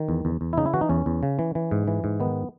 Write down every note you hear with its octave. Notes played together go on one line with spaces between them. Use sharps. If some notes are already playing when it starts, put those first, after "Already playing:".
Already playing: D#3
E2
E2
E2
E4
C#3 D#4
E4
E3 F#4
D#4
E2 C#4
E2
C#3
E3
E3
G#2
E3
G#2
D#3 B3